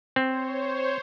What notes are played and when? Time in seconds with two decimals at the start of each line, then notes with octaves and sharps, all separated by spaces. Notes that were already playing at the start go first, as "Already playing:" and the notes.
0.16 C4 C5 C#5